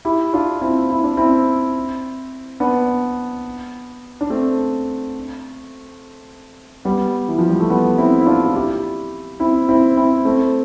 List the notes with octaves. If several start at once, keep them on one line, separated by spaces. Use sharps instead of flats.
E4 G4
D4 F4
C4 E4
E4
D4
C4 E4
B3 D4
D4
A3 C4
G3 B3
E3
F3
G3
A3
G3 B3
C4 E4
E4
D4 F4
F4
E4 G4
C4 E4
C4 E4
C4 E4
A3 C4